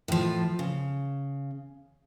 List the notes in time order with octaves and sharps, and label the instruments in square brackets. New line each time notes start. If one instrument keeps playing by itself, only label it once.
[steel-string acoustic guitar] A2 F3
C#3